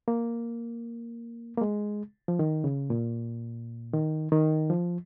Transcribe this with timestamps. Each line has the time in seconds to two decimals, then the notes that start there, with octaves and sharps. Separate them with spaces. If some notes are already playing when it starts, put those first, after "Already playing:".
0.08 A#3
1.57 A#3
1.61 G#3
2.28 F3
2.39 D#3
2.64 C#3
2.90 A#2
3.93 D#3
4.32 D#3
4.70 F3